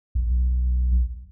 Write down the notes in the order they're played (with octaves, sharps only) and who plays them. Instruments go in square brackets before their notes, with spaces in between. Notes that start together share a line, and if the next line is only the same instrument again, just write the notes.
[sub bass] B1